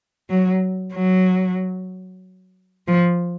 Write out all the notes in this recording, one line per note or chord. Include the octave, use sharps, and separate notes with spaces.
F#3
F#3
F3